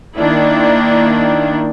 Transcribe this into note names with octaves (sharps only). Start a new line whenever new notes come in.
D#3 A#3 D4 E4